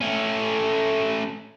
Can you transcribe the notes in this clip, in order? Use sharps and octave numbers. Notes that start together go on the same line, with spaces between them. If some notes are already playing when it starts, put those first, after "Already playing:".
A3 C#4